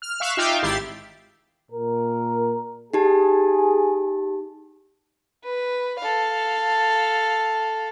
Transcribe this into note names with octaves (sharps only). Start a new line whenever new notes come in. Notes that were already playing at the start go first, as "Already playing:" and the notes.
F6
E5 F5 C#6 F#6
D#4 F4 E5 F5 G5 D6
G#1 E4 G4 A6 C7
A#2 A#4
D#4 G4 G#4 A5
B4
A4 F5